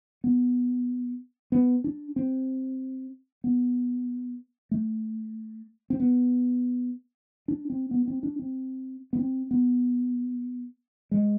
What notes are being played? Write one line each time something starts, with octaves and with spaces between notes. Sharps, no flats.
B3
B3
D4
C4
B3
A3
C4
B3
D4
C4
B3
C4
D4
C4
B3
C4
B3
G#3